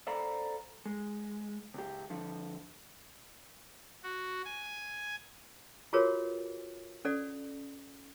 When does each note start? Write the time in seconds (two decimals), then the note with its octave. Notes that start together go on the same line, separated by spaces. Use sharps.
0.07 A4 C5 D5 F5 A#5 B5
0.86 G#3
1.74 C#2 G4
2.10 D3 F3
4.03 F#4
4.45 G#5
5.93 F4 F#4 G#4 A#4 B4 C#5
7.05 C#4 A4 D5 F#5